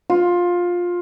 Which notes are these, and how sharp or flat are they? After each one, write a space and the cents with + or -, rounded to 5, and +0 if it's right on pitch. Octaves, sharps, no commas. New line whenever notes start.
F4 +15